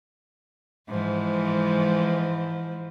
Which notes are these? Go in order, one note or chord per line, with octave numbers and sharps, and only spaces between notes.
G#2 E3 F3